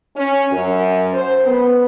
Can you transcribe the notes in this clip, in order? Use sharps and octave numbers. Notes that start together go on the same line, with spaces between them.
C#4
F#2
C5
B3